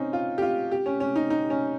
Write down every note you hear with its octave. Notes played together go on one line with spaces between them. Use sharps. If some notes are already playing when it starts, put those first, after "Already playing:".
Already playing: C4 C#4 D#4
F4
G4
F4
G4
C#4
C#4
D#4
D#4
C#4